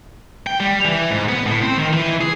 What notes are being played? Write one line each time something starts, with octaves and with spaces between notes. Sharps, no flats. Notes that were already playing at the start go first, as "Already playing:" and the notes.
G5
G3
E3
G#2
B3
A2
C4
D#3
E3
G#4